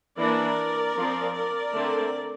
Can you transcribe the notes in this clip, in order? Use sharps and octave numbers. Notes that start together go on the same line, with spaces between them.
E3 A#3 D4 A#4 D5
F3 C4
A#4 D5
D3 A3 C4